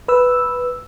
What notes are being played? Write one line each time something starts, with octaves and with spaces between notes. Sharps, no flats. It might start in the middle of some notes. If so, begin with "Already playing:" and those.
B4 E6